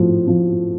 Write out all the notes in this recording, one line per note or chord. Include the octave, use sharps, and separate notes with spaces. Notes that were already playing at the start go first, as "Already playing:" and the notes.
Already playing: A2 F3
F3